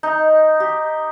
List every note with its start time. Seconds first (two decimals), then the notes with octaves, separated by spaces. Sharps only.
0.03 D#4
0.60 G4